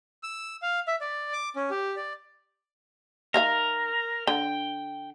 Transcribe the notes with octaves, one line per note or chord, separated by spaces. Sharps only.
E6
F5
E5
D5
D6
C#4
G4
D5
D#3 A#4 E5 F5
D3 G5